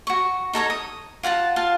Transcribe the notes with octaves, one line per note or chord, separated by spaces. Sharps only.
F#4 C#6
D#4 A4 C#5 A#5
D#6
F4 F#5 G#5 A5
F4 F5 A5